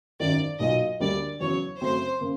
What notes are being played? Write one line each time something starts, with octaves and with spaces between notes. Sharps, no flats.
G#1 F#2 D#3 D5
B1 A#2 F#3 D#5
D2 D3 G3 A#3 D5
E2 C#3 F#3 C#5
F#2 C#3 F#3 A3 C4 C5
C#3 A#3